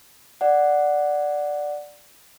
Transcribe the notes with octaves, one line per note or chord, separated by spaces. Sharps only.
D5 F#5